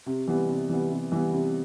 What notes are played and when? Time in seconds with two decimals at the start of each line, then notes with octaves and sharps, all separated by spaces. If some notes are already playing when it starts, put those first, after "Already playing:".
0.06 C3
0.27 E3 G3 B3
0.49 C3
0.69 E3 G3 B3
0.91 C3
1.12 E3 G3 B3
1.33 C3